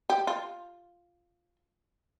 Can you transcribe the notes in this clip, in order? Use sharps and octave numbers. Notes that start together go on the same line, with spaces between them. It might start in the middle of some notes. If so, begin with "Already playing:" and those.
G4
F4